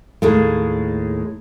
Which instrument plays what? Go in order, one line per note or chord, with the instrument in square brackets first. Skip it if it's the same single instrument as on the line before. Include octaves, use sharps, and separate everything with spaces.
[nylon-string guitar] D#2 A2 G#3